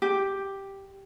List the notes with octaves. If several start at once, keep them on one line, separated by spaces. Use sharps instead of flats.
G4